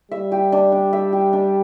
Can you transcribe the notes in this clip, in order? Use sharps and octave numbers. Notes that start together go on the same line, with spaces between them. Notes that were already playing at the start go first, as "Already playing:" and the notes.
G3 E5
G4
D4
D4
E5
G4
D4